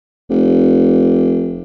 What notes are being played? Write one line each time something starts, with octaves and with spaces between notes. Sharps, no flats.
F1